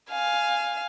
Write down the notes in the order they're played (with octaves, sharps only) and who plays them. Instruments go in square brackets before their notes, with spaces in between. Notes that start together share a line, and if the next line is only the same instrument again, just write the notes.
[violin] F5 G#5